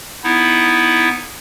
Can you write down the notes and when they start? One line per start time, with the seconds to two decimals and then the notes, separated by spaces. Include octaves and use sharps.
0.24 B3 D#4 E4